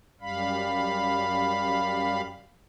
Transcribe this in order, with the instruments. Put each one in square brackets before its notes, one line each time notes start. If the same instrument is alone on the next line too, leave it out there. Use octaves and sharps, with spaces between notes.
[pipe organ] F#2 G3 F5 B5